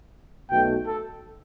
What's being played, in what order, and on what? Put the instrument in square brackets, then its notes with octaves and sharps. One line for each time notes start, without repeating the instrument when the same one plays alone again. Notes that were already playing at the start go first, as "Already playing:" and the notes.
[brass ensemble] B1 B2 A3 [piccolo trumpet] G5
[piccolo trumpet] A4